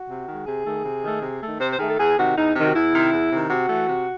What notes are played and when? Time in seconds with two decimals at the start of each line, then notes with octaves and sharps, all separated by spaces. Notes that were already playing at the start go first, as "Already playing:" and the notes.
Already playing: F#4
0.09 C3
0.27 D#3 G#3
0.46 C3 G#4
0.66 D#3 A3
0.85 C3
1.04 D#3 A3
1.22 C3
1.41 D#3 A3
1.60 C3 C5
1.71 C5
1.79 D#3 A3 G#4
1.88 A4
1.99 E2 G#4
2.17 C3 D#3 F#4
2.36 E2 D#4
2.56 C3 D#3
2.64 F#4
2.75 E2 E4
2.93 C3 D#3
3.13 E2
3.32 C3 D#3
3.50 C3 F#4
3.69 E3 A3
3.88 C3